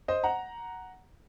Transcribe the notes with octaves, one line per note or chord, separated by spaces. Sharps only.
C5 D#5
F#5 A#5